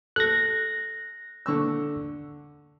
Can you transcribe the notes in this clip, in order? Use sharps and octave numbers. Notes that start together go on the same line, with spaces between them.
A4 F#6 A#6
D3 C#6 E6